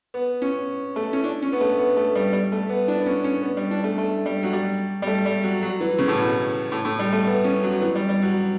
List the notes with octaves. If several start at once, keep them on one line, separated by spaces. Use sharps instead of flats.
B3
C#4
A3
C#4
D4
C#4
B3
A3
B3
A3
G3
G3
A3
B3
D4
B3
C#4
C#4
B3
G3
D4
A3
A3
G3
F#3
G3
G3
A3
G3
F#3
F#3
E3
C#3
A2
B2
A2
A2
G3
A3
B3
C#4
F#3
E3
G3
G3
F#3